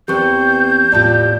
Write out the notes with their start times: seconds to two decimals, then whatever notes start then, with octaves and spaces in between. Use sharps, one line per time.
0.08 E2 C4 G4 B4 C#6 G6
0.92 E2 A2 F4 G4 D5 A5